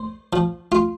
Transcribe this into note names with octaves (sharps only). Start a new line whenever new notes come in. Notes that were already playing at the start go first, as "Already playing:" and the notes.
Already playing: C5
F3
F4